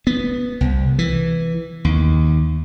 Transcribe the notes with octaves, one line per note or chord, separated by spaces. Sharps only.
B3
C2
E3
D#2